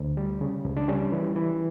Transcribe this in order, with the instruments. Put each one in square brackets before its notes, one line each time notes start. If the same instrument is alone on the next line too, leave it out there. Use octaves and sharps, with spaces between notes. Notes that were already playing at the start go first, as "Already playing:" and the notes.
Already playing: [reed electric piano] D2
G3
C#3
C#2
D4
G3 C#4
E3
E3